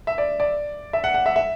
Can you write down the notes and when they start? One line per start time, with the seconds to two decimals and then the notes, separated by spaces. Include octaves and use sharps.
0.07 E5
0.18 D5
0.40 D5
0.93 E5
1.04 F#5
1.14 F#5
1.26 E5
1.36 E5